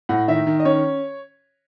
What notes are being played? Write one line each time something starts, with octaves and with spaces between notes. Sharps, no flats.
A2 F#5
D#3 E5
D#3
D#5
C#4 C#5